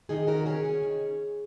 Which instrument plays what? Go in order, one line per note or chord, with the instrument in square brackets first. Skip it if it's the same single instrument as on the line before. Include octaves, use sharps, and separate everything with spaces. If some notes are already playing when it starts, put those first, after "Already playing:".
[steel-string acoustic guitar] D#3 D#4 G#4
C#4 F#4 A#4
C#4 G#4 C#5
C#4
D#3